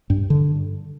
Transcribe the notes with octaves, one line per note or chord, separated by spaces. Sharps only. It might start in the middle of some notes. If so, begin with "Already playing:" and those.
G2
D3